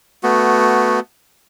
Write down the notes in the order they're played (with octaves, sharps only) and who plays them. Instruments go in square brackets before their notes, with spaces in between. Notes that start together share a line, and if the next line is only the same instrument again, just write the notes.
[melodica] A3 B3 F#4